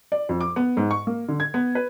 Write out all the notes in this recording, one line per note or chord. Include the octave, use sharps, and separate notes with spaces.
D5
F2
D6
B3
G#2
C#6
A#3
D3
G#6
B3
B4